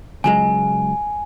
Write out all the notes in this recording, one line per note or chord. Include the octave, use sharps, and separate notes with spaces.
C#2 F#3 G#3 G#5